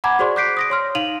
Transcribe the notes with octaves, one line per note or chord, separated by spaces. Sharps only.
F#5 G#5 A#5 B5 D6 G#6
F#4 G#4 C5 D5 C6 C#6
D6 F#6 G6 B6 C7 D7
D#6 A#6 D7
C#5 C6 F6
D#4 F5 D#7 F7 F#7